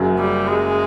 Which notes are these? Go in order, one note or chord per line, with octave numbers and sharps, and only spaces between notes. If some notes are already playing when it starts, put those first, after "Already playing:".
Already playing: F#1 F#2 C#3 F#3
G3
G#3